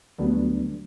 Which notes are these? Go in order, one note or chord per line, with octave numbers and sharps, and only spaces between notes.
D2 F#3 G3 A3 B3 D4